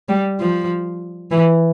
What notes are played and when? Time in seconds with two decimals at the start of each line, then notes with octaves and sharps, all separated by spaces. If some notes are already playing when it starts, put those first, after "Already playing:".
0.09 G3
0.40 F3
1.31 E3